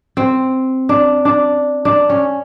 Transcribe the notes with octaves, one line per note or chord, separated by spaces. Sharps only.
C4
D4
D4
D4
C#4